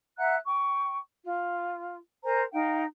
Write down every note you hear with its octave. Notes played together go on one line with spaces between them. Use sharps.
E5 F#5 A#5 F#6
G5 C#6
F4
A#4 C5 G#5 A#5
D#4 F5 G5